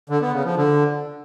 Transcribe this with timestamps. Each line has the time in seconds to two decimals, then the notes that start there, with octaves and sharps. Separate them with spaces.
0.10 D3
0.21 B3
0.33 C#3
0.45 F3
0.57 D3